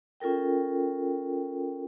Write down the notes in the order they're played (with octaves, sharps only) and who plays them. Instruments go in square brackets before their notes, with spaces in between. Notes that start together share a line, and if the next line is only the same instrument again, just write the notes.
[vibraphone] C#4 F4 A4 A#4 G5